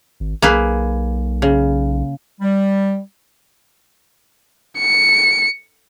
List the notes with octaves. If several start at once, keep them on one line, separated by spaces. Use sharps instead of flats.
G#1
B1 A#3 G#4 B4
C#3
G3
C#7